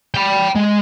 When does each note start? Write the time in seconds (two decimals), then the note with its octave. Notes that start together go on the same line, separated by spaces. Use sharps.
0.15 G5 B5
0.55 G#3